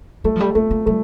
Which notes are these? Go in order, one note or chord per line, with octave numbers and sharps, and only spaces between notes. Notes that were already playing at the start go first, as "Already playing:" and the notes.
G3 A3
F3
G3
A3 A#3
A#3
G3 A3